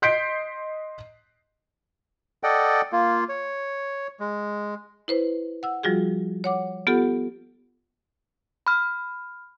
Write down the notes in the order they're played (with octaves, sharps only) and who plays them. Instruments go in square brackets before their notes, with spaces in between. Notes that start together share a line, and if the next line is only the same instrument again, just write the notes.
[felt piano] D#5 C6 G6 B6 C7 D7
[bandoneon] A4 D5 D#5 F#5 G5
A#3 F4
C#5
G#3
[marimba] E4 B4 C5
F#5 E6
F3 G3 F4 F#4 G#4
C#5 F#5 D6
B3 F4 G4 A4 F#5
[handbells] B5 F6